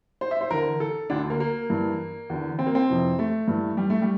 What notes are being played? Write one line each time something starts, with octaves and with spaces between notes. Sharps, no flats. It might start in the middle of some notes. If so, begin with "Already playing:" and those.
C5
E5
C5
E2 D3 A#4
A4
D2 D3 D4
A#3
A#3
G2 E3
E2 D3
C4
A#3
C4
F2 C3 E3
A3
G2 E3
G3
A3
G3